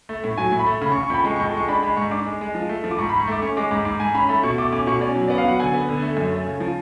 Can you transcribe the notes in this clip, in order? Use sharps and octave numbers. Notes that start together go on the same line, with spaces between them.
A3
A2
F#3 G#5
A2
B5
A3
C#3 B5
C#6
C#3
C#6
F2 B5
G#3 C#6
C#6
F2
G#3 C#6
D4 B5
G#3 B5
G#2 C#6
D4 D6
G#3
G#3
F3
A3
F3
D6
G#2 C#6
B5
G#2
C#6
A3 D6
C#4 C#6
G#3 D6
G#2 D6
G#2 D6
G#2 G#5
C#4 B5
A3 B5
B2 C#6
A3 D6
C#4 D6
B2 C#6
C#4 D5
F#3
B3 D5
F5
F#3 F#5
D3 G#5
B3
D3
A3
F#2
A3
C#3
F3